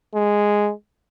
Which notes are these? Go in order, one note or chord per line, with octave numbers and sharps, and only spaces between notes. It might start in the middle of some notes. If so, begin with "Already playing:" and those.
G#3